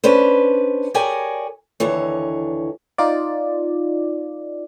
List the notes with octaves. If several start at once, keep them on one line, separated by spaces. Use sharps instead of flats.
C#4 D4 B4 C5
G4 G#4 A#4 C#5 D5 G#5
D#2 D3 E3 C#5
D#4 F4 D5